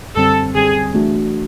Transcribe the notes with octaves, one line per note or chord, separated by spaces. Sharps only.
F#2 D3 G3 C4 A4
F#2 D3 G3 C4 G#4
E3 A3 D4 F#4